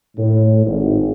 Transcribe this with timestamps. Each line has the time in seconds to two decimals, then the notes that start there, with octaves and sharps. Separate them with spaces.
0.17 A2
0.65 G#1